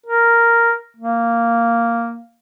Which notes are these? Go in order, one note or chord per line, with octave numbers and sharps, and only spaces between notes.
A#4
A#3